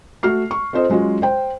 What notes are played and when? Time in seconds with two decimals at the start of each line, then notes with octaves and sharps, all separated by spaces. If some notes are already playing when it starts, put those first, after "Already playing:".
0.23 A3 F#4 F6 C7
0.51 C#6
0.73 C4 F4 A4 C5 D#5
0.90 F#3 G#3 C#4 F4 F#4
1.22 C5 G5